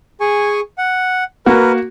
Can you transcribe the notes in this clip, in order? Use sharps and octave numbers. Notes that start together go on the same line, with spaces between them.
G#4 G#5 C#6
F#5
A#3 F#4 A#4 B4